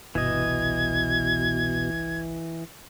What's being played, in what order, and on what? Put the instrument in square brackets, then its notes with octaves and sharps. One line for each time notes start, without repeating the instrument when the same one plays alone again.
[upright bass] G1 C2 [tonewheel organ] B2 [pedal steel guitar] E3 D#5 [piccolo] G#6